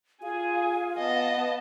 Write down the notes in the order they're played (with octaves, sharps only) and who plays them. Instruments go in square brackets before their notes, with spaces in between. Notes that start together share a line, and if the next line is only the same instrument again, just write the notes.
[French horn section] F4 [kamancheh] G#4 G#5 [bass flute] F5
[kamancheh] B3 [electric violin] D#5 A5